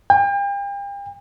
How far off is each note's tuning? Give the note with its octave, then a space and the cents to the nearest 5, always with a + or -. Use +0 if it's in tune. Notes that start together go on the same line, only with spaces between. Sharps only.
G5 +40